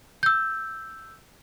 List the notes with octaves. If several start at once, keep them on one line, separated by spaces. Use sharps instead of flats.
E6 G6